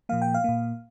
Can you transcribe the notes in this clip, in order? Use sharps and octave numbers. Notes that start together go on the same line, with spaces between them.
A#2 F3 A#3 F5
G5
F5
A#2 A#3